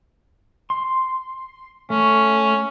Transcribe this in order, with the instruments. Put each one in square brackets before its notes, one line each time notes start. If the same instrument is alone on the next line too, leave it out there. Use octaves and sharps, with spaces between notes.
[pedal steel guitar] C6
[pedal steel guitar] A3 [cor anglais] C#4